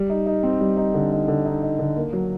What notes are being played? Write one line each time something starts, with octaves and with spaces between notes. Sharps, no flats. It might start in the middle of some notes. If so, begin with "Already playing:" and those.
Already playing: G3
D#4
D#4
C4
G3
D#4
D3
D#4
D3
D#4
D#4
D3
A#3
F#3